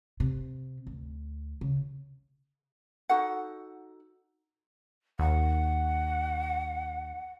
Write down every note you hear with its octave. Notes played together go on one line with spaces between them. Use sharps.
C3
D2
C#3
D#4 F#4 A4 F#5
D#2 F#5